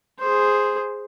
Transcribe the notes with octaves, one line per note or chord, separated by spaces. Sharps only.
G#4 C5